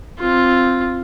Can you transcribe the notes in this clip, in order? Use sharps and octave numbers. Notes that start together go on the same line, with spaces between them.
C4 F4